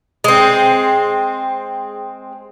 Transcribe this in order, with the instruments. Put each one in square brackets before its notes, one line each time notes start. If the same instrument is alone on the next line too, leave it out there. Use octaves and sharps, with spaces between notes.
[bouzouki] G#3 C4